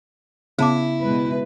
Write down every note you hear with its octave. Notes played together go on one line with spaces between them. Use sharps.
C#3 B3 E4 A5 D6
B2 G#3 B4